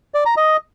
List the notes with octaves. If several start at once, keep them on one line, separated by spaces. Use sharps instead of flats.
D5
A#5
D#5